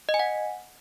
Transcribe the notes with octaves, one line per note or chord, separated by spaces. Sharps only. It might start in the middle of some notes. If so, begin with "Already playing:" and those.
D#5
G#5
F#5